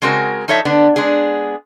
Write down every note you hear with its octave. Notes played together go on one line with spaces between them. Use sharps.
C#3 G#3 C4 F#4 A#4
F3 D#4 A4 C#5 E5
D3 B3 D4
G#3 B3 D4 G#4